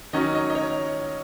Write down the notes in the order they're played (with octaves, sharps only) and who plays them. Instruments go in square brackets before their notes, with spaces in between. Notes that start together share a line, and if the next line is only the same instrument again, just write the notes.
[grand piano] D#3 F#3 C#4 D#5
D#5
D#5
C#5